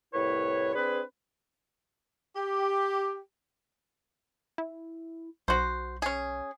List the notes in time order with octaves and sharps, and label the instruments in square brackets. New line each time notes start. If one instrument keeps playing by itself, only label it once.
[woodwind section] C2 A2 E4 B4 C#5
C4 D4 G#4 B4
[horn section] G4
[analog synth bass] E4
[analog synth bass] B1 [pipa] F#4 C5
[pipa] C#4 G#4